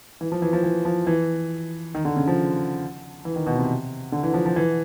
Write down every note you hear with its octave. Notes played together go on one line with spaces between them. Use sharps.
E3
F3
E3
F3
E3
F3
E3
D#3
D3
C#3
F3
E3
D#3
B2
C3
D3
E3
F3
F3
E3